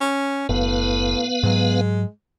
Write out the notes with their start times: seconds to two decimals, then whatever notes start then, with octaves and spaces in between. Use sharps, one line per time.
0.01 C#4
0.49 F#1 A2 B3 B4 F5
1.43 G#2 F#3 G#3